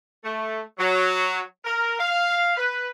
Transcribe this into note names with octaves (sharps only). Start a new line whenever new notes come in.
A3
F#3
A#4
F5
B4